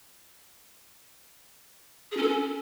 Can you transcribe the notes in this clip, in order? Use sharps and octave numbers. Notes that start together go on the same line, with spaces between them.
G#4
C#4
A4
C#4